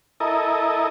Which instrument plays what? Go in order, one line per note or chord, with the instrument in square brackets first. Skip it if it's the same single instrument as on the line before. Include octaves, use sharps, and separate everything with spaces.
[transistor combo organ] E4 A4 A#4 D#5